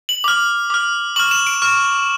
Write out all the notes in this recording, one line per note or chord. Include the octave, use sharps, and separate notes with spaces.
F#7
D6 F6
D6 F6
C#6 F6 F#7
E7
D7
C#6 F6